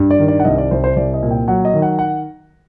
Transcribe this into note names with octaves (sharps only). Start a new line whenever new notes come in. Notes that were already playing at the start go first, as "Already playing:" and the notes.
Already playing: G2
D5
D#3
D5
F#5
C2 D#5
D5
C2 C5
C5
C2 D5
D#5
A#2
G5
F#3 F#5
D#5
D#3
F#5
F#5